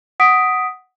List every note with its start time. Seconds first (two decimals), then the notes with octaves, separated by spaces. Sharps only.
0.20 F#5 D#6 B6 D7